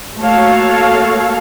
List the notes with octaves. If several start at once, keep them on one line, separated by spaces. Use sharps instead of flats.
A3 A#3 F#4 A4 C#5 F5